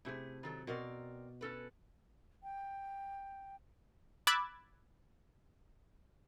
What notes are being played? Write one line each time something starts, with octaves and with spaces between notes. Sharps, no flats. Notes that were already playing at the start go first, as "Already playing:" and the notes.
C3 A3 E4 G#4
D#3 F#3 A4
B2 C4 A#4 D5
C#4 A4 B4
G5
B5 D6 E6 F#6 G#6 A6